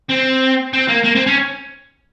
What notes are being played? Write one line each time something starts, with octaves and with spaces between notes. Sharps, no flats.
C4
C4
A#3
A#3
C4
C#4